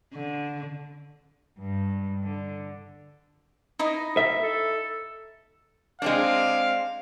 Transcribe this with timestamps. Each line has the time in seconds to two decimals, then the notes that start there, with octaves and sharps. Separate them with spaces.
0.13 D3
1.59 G2
2.23 D3
3.79 D#4 E4 D#5
4.17 E5
4.43 A4
6.02 G#3 C4 D4 F5